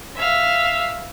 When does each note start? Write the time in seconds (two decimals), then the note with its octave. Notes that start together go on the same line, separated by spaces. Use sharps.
0.17 E5 F5